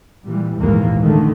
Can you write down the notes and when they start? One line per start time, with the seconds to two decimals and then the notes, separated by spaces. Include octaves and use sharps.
0.24 A#2 E3 G3
0.59 A#1 D#2 G#2 E3 G#3 A#3
1.00 D3 D#3 A3